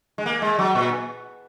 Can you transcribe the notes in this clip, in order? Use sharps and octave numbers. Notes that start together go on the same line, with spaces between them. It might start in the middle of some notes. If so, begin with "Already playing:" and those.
G#3
A#3
G#3
F#3
A#2